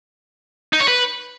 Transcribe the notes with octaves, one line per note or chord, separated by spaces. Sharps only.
D#4
C#5
B4